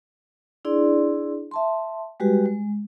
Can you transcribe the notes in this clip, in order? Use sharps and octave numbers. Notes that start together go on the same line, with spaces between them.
D4 E4 G#4 D5 C6
E5 A5 C6
G3 G#3 F#4 G4 B4
G#3